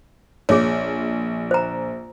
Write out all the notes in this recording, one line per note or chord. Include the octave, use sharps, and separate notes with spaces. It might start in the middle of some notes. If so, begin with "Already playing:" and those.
A#1 G#4 C#5
C5 A#5